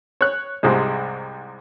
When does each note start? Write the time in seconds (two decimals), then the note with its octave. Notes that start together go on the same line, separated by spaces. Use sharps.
0.21 C#5 F#6
0.63 C2 G#2 C3 G#3